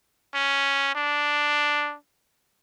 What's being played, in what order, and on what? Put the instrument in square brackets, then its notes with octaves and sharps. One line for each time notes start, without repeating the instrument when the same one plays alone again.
[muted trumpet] C#4
D4